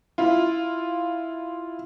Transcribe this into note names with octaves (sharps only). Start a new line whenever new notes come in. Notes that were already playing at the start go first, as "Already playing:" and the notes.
E4 F4